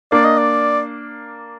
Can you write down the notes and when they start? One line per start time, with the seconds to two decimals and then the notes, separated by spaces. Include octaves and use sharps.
0.12 A#3 D4 D5
0.24 D#5
0.37 D5